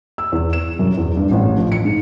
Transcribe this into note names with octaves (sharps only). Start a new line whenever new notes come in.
E6
E2
E7
F#2
E2
G2
A1
F3
C#7
G#2